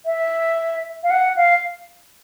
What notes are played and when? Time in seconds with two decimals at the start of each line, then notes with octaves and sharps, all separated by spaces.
0.06 E5
1.03 F5
1.10 F#5
1.36 F5